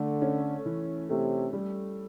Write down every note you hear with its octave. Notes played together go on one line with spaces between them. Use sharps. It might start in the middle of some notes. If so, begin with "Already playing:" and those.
Already playing: D3 A3
C#4
E3
C3 A3
G3